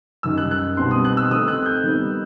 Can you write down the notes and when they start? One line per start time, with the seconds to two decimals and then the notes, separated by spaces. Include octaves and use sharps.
0.23 F#2 D#3 G3 D#4 E6
0.37 F#6
0.51 F#6
0.77 B2 G3 C4 D#4 C6
0.91 D#6
1.05 F#6
1.17 E6
1.30 D#3 A3 C4 D#4 D#6
1.48 F#6
1.66 G6
1.83 D#3 G3 B3 D#4